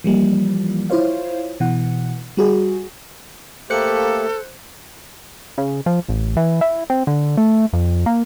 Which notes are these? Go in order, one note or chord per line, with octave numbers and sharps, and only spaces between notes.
E3 F3 G3 A#3
E4 F4 C5 C#5 F5
B2 E3 F#5
G3 F#4 G#4
A3 A#3 G4 A4 C5 F#6 C#7
C#3
F3
A1
E3
E4
C4
D3
A3
F2
A#3